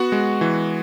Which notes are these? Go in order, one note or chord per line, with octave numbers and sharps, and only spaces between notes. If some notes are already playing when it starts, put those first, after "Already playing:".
Already playing: B3 F#4 F#5
G#3
E3